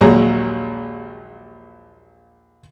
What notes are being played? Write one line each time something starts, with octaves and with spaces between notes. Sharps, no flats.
A#1 D#2 A#2 F#3 G#3 A#5